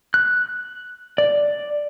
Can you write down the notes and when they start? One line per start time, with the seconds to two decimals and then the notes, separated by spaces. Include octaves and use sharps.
0.14 F#6
1.18 D5